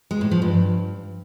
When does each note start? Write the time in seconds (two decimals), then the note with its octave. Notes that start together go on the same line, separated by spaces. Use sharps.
0.11 G#3
0.21 A2
0.31 F3
0.42 G2